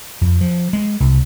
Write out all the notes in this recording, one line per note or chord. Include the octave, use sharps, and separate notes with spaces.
F2
F3
G#3
C2